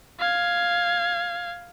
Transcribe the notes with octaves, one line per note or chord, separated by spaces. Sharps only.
F5 G#6